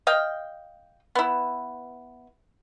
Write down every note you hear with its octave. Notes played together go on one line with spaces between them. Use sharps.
D#5 F5 G5
B3 E4